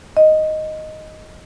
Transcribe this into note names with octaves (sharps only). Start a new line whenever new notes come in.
D#5